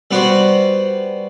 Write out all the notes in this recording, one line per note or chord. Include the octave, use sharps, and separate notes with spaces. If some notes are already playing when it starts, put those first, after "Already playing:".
G3 B3 F#4 C5